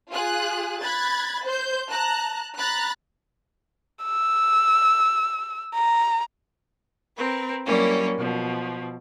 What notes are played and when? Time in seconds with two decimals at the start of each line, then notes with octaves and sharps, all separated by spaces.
0.11 F4 G#4 F#6
0.81 B5 F#6 G#6 A6
1.44 C5 G6
1.90 A5 A#5 F#6
2.57 A#5 B5 F#6 A6
4.04 E6
5.75 A#5
7.16 C4 A#4 B4
7.66 F#3 G3 A#3 C#4 E4
8.17 B2 F3